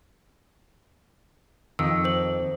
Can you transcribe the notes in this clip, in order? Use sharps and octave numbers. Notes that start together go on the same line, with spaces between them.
F2 D#3 E6
C5 F#7